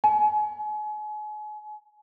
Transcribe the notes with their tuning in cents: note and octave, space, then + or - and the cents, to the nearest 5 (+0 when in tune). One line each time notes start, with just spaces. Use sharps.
G#5 +35